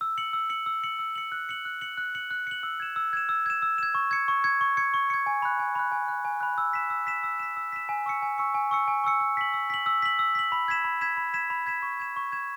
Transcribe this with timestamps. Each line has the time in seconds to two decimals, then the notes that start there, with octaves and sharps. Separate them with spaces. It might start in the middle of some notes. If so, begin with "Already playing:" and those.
0.01 E6
0.18 C#7 F#7
0.33 E6
0.50 C#7 F#7
0.66 E6
0.83 C#7 F#7
0.99 E6
1.15 C#7 F#7
1.32 F#6
1.49 C#7 F#7
1.65 F#6
1.81 C#7 F#7
1.97 F#6
2.15 C#7 F#7
2.31 F#6
2.47 C#7 F#7
2.63 E6
2.80 G#6 E7
2.96 E6
3.13 G#6 E7
3.29 E6
3.46 G#6 E7
3.62 E6
3.78 G#6 E7
3.95 C#6
4.11 G#6 C#7
4.28 C#6
4.44 G#6 C#7
4.61 C#6
4.77 G#6 C#7
4.94 C#6
5.10 G#6 C#7
5.26 G#5
5.42 B5 F#6
5.59 G#5
5.75 B5 F#6
5.92 G#5
6.08 B5 F#6
6.25 G#5
6.41 B5 F#6
6.58 E6
6.73 B6 E7
6.90 E6
7.07 B6 E7
7.23 E6
7.40 B6 E7
7.57 E6
7.72 B6 E7
7.89 G#5
8.06 C#6 E6 C#7
8.22 G#5
8.38 C#6 E6 C#7
8.54 G#5
8.71 C#6 E6 C#7
8.88 G#5
9.04 C#6 E6 C#7
9.20 E6
9.37 B6 F#7
9.54 E6
9.70 B6 F#7
9.86 E6
10.02 B6 F#7
10.19 E6
10.35 B6 F#7
10.52 B5
10.68 G#6 B6 E7
10.84 B5
11.01 G#6 B6 E7
11.17 B5
11.34 G#6 B6 E7
11.50 B5
11.67 G#6 B6 E7
11.82 C#6
12.00 G#6 E7
12.16 C#6
12.32 G#6 E7